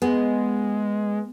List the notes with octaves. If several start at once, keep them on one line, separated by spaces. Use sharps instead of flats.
G#3 B3